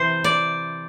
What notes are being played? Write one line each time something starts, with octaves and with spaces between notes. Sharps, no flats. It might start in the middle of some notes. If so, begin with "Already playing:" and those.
Already playing: C3 E3 C5
D5